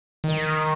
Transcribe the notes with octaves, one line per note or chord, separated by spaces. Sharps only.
D#3